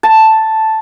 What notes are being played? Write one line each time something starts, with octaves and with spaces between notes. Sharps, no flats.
A5